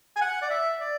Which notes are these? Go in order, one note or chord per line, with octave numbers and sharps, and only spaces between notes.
G#5
F#5
D5
E5
D5